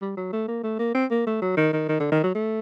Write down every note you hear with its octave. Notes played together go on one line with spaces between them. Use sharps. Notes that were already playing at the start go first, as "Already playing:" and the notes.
G3
F#3
A3
A#3
A3
A#3
C4
A#3
A3
F#3
D#3
D#3
D#3
D3
D#3
F#3
A3